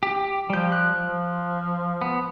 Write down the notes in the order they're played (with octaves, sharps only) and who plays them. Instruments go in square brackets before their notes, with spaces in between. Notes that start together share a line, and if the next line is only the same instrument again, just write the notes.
[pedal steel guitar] G4
[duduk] F3 [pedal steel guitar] G3 G6
[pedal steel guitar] F#6
[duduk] F3
[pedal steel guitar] B3